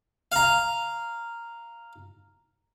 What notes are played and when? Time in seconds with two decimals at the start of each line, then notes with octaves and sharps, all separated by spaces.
0.32 F5 A#5